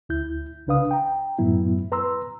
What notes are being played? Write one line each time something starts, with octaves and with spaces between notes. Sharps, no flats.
D2 E4 G6
C2 C#3 D4 B4 F5 D#6
G5 A#5
F#2 A2 F#3 B3 E4
B4 A#5 C6 E6